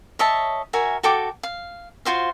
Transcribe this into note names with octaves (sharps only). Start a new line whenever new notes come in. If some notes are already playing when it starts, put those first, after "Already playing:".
C#5 D#5 E5 A5
F#4 A#4 E5 G#5
F#4 A4 G5 D6
F5
F4 F#4 C5 F5